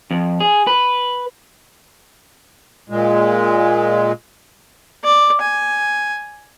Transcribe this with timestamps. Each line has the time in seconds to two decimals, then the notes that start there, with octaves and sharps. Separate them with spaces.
0.11 F2
0.40 G#4
0.67 B4
2.90 A#2 G#3
5.04 D5
5.42 G#5